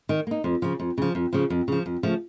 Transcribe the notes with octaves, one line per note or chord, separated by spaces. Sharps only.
D#3
A#3 D#4
F2
C#3 F3
F2
C#3 F3
F2
C#3 F3
F2
C#3 F3
F2
C#3 F3 A3